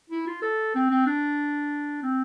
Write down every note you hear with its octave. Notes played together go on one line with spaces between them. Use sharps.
E4
F4
A4
C4
C4
D4
C4